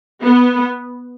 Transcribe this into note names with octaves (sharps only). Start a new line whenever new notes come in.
B3